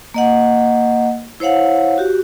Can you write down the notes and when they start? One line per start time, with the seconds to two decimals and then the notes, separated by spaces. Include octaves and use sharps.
0.14 A#3 D#5 F#5
1.40 E4 C5 C#5 F5 F#5
1.98 F#4 G4